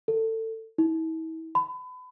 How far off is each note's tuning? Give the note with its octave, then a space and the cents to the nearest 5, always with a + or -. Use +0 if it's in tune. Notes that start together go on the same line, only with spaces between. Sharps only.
A4 +25
E4 -40
B5 +30